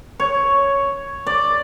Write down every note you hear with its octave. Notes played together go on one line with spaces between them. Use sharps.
C#5
D5